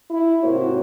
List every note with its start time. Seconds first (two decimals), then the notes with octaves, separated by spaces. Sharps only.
0.10 E4
0.43 G#2 C3 A#3 F#4 C5 C#5